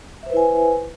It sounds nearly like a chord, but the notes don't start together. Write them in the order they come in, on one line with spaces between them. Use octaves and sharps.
E5 C5 B4 E4 G#5